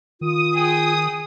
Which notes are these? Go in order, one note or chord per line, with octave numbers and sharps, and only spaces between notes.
D#3 F4 D#6
G#4 G5